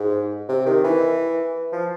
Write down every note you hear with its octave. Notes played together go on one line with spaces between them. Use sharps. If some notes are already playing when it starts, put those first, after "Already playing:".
Already playing: G#2
C3
D#3
E3
F3